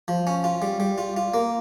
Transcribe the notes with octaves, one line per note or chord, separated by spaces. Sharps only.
F3
C#4
F4
G3
G3
F4
F4
A#3